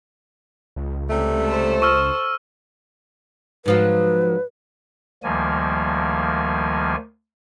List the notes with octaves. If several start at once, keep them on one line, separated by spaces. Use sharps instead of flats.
C#2
C3 G3 A3
A4 C5
C#6 E6 F6
G#2 F3 F#3 B4
D2 D#3 F3 G3 A#3 G#5